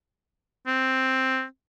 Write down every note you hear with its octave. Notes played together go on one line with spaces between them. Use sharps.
C4